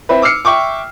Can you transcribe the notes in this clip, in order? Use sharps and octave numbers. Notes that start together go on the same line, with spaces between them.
C4 E4 B4
D6 E6 F6 C7 C#7
E5 G5 C#6 D6